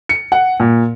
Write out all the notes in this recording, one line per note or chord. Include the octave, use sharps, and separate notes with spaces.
C#7
F#5
A#2